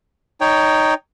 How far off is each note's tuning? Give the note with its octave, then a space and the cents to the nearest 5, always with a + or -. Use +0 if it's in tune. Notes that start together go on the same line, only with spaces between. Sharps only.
D#4 -5 C#5 +15 G5 +0